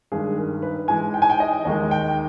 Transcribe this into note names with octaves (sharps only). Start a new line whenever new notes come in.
G2 D#3 G#3 G#4
A#4
B4
G#2 E3 G#3 G#5
G5
G#5
G5
D#5
D#2 D#3 G#3 D#5
G5